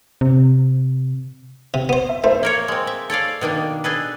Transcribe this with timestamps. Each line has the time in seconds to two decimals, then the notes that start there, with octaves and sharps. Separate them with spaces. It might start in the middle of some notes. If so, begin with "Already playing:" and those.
0.21 C3
1.74 C3
1.89 B3 C5
2.09 E5
2.24 A3 C5 E5
2.43 A#3 A#4 C#5
2.68 G#3 C4
2.87 E5
3.10 A4 C#5 D5 F5
3.41 B2 D#3 A#3 D4
3.84 D4 G#4 A4 B4